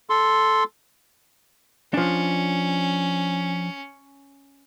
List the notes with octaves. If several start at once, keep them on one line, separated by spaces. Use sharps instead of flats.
A4 C6
F3 C#4 D4